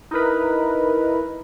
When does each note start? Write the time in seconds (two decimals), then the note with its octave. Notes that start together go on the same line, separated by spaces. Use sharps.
0.11 D#4 E4 A#4 B4